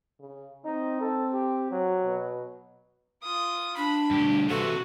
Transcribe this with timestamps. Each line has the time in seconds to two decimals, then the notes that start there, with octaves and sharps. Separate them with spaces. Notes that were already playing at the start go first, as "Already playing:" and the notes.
0.19 C#3
0.65 C4 D#4
1.01 A4
1.33 G4
1.71 F#3
2.05 B2
3.23 F4 D#6
3.77 D4 B5
4.11 D2 G2 G4
4.48 C3 E3 F#4 A4